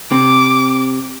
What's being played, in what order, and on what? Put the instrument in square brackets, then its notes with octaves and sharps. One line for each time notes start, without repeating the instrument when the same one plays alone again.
[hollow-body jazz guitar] C3 [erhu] D6